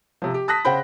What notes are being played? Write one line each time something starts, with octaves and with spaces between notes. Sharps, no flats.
C3 F3
G4
A5 D#6 F#6 A#6 B6
C#3 C5 F#5 G5 B5